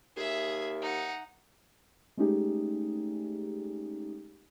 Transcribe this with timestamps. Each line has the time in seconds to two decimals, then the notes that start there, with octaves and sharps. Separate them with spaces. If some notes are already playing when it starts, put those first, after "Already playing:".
0.16 D#2 G#4 E5
0.82 D#4 F#5
2.17 G#3 A3 C#4 D#4 G4 G#4